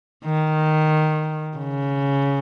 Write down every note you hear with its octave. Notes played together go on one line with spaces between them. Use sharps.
D#3
C#3